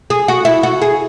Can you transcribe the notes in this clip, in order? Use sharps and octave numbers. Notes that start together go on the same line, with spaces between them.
G#4
F#4
E4
F#4
G#4